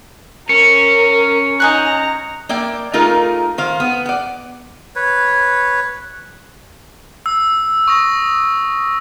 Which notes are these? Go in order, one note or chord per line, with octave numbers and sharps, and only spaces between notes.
C#4 A#4 C#7
D#4 G#5 A#5 F#6
A#3 D5 E5 G5
A3 D#4 F4 G#4 A#4
D#3 C5 F5
B3
D5 F#5
B4 C#5
E6
C#6 D#6 A#6